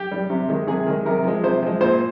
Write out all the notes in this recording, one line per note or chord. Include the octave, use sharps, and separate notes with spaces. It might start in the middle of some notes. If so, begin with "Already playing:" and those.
Already playing: G4
G3
C3
D#3 G#3
C3 G#4
D#3 G#3
C3 A#4
F3 G#3
C3 C5
F3 G#3
A#2 C5